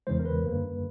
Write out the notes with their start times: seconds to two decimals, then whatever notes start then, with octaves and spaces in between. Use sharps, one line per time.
0.07 E2 C#3 E3 G#3 C5
0.20 A#4
0.25 B4
0.43 F#2 D3 G3 A#3